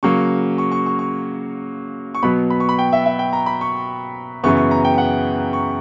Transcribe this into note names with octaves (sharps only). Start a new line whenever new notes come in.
C#3 F#3 A#3 C#6
C#6
C#6
C#6
C#6
C#6
B2 F#3 B3 B5
B5
C#6
B5
G5
E5
E5
G5
A#5
B5
C#6
F#2 C#3 E3 B3 C#6
C#6
A#5
G5
F#5
C#6